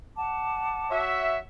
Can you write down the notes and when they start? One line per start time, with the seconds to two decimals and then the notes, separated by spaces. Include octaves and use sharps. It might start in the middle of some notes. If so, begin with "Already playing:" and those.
0.16 F#5 A5 D6
0.91 F#4 C#5 E5